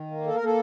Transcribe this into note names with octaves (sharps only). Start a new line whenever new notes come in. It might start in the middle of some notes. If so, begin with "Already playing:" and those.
Already playing: D#3
A#3
A4
A#4
A#3 A4